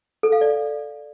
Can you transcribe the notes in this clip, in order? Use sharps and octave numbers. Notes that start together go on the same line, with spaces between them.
A4
F5
D5